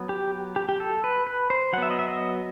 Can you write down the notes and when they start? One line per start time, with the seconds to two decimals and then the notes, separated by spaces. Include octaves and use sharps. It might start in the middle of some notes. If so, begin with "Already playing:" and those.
Already playing: F#3 B3
0.09 G4
0.56 G4
0.69 G4
0.80 A4
1.04 B4
1.27 B4
1.50 C5
1.73 F#3 F#5
1.78 B3 E5
1.91 D#5
1.99 E5
2.08 D#5